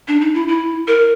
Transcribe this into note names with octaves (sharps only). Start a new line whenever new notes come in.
D4
D#4
E4
E4
A#4